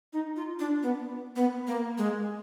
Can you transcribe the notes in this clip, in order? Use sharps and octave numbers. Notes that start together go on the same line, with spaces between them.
D#4
F4
D4
B3
B3
A#3
G#3